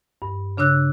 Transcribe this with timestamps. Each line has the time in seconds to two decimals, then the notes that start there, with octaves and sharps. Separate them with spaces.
0.22 G2
0.57 C#3 D4 C#5 E6 F#6